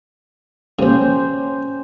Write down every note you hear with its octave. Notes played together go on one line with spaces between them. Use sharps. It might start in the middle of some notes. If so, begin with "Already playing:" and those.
A#1 C#3 C#4 G4 C5